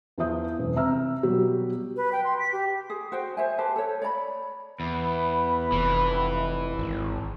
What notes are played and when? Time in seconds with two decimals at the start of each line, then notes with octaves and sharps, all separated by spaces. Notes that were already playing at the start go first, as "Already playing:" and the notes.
0.18 E2 F3 F4 E5 D#6 G6
0.59 E1 F#2
0.75 C3 E5 A#5 E6 F6
1.23 B2 F#3 G3 F#4 G4
1.97 B4
2.12 G5
2.24 C6
2.39 B6
2.52 G4
2.90 G#4
3.12 F#4 C5 G5
3.37 C5 E5 G#5
3.58 G4 B4 C5 A5
3.76 A4 C#5
4.02 C#5 D5 A#5 B5
4.80 E2 B4 B5
5.72 F1 E3
6.79 G#1